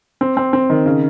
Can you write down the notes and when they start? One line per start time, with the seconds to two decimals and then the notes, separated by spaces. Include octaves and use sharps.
0.21 C4
0.37 C4
0.53 C4
0.70 D#3
0.86 C#3